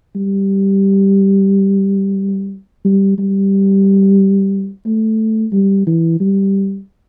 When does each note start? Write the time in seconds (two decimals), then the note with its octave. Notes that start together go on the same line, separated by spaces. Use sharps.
0.16 G3
2.85 G3
3.18 G3
4.86 A3
5.53 G3
5.87 E3
6.20 G3